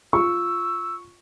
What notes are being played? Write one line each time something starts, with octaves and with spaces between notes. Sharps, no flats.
F4 C#6 E6